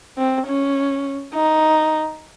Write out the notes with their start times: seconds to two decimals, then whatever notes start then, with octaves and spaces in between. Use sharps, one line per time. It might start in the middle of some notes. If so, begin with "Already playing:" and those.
0.18 C4
0.47 C#4
1.34 D#4